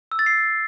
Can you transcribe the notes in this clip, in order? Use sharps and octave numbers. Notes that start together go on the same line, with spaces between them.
E6
A6
C7